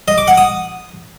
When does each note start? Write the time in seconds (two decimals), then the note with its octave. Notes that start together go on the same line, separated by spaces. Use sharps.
0.08 D#5
0.18 D6
0.28 F#5
0.38 D#6